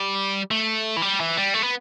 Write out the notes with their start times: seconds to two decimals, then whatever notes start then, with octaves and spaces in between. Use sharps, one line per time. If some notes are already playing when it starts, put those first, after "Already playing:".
Already playing: G3
0.51 A3
0.97 E3
1.02 G3
1.20 E3
1.37 G3
1.54 A3
1.63 B3